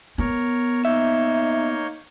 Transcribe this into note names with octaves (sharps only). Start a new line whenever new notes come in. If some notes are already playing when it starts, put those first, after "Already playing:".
B3 A#4 C#5
A#3 D#4 C#5 E5 G6